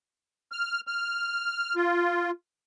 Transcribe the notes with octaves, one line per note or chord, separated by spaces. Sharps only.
F6
F6
F4